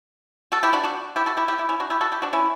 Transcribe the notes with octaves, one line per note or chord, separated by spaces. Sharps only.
F#4 A4
E4 G4
D4 F#4
D4 F#4
E4 G4
F#4 A4
E4 G4
E4 G4
E4 G4
C#4 E4
D4 F#4
E4 G4
F#4 A4
E4 G4
D4 F#4
C#4 E4